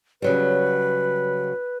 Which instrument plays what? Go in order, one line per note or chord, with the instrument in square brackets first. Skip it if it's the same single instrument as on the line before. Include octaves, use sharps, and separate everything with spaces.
[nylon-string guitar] C#3 F#3 G3 [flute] B4